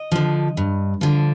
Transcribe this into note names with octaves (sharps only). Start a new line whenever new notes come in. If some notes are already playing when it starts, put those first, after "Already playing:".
Already playing: D#5
D3 F3
G2
D3 F3